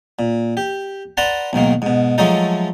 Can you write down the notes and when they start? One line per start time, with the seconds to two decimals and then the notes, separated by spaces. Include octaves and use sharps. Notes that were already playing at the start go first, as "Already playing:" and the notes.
0.19 A#2
0.57 G4
1.17 B4 D5 F#5 A5 A#5 C6
1.53 B1 G#2 D#3 A#3
1.82 G#2 B2
2.18 F3 F#3 G#3 A3 D#4 A4